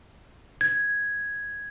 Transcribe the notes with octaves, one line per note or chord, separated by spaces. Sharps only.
G#6